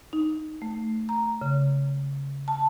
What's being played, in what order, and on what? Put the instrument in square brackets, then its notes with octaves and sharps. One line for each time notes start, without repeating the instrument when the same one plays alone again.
[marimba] D#4
A3
A#5
C#3
A5